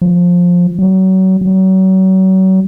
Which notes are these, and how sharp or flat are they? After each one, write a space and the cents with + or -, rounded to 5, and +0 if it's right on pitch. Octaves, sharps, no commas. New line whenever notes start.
F3 +15
F#3 +30
F#3 +35